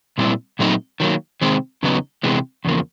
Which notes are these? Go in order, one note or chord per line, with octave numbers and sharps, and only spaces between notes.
A#2 G3 C4 E4
A#2 F#3 A3 C4 D#4
D#3 F#3 A#3
C3 D#3 G#3 C4
E2 C#3 F#3 B3 D#4
C3 E3 G#3 B3
E2 C#3 F3 A#3